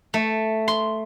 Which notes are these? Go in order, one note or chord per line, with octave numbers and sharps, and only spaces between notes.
A3
C6